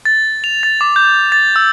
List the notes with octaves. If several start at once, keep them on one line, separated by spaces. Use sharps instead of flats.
A6
F7
A6
D6
G6
A6
E6